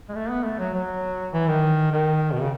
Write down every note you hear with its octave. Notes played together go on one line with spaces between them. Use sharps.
G#3
A3
B3
A3
F#3
F#3
E3
D#3
D#3
B2
C#3